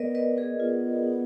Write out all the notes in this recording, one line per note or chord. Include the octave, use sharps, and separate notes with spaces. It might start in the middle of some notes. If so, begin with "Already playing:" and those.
Already playing: B3 A#4 B4 D5 D#5
B4 D#5
G#4 B4
B3 F4